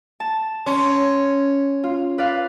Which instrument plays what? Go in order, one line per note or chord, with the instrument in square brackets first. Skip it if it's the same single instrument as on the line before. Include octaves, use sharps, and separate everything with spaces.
[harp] A5
[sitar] C#4 [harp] C6
[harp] F4
B4 D5 F5